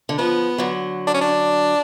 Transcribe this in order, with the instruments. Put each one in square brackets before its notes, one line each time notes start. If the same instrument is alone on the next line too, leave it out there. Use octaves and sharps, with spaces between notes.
[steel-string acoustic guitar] D3
[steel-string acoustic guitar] F3 [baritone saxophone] B3
[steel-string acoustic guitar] D3 F#3
[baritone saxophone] D4
C#4
D4